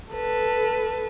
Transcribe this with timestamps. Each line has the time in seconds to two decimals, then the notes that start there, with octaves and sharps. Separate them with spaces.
0.12 A4 B4